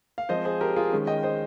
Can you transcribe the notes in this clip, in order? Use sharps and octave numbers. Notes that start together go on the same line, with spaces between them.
F5
F3 G#3 C4 C5 D#5
G#4 C5
G4 A#4
F4 G#4
D#3 G#3 C#4
D#5 G5
C5 D#5